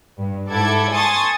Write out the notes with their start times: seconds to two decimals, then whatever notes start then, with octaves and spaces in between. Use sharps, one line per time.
0.19 G2
0.51 G#2 E4 A4 F#5 D6 G#6
0.92 G#5 A5 C6 C#6 D#6 A6